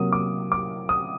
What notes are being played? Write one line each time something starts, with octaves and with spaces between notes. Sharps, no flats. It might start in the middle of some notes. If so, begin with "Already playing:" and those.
Already playing: C3 F#3 A#3 D#6
D6
D6
D#6